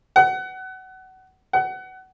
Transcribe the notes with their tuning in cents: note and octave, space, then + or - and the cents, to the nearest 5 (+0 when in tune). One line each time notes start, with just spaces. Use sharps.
F#5 +25
F#5 +25